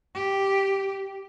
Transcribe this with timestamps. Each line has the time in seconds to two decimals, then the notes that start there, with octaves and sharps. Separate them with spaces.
0.14 G4